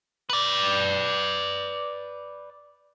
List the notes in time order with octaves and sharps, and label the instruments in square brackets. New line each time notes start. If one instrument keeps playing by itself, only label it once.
[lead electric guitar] B4 D5